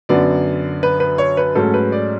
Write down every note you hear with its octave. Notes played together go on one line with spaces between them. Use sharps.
F#2 D3 F#3 B3 D5
B4
B4
C#5
B4
G#2 F#3 A3 C#4 A4
B4
D5